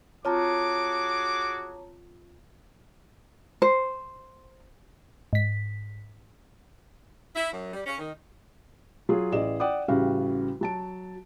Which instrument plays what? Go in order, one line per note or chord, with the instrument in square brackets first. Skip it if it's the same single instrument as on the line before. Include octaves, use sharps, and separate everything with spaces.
[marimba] C4 F4 [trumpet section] F#4 G#4 D6 [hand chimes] C#5 A5 A#5
[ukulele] C5
[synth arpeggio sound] G#2 B6
[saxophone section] E4
F#2
G3
C#4
D#3
[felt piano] F#3 F4 G#4
A1 G#4 D5 D#5 E7
D5 F#5 G5 D6 D#6
A1 C#3 G3 F#4 F5
F#3 A5 D7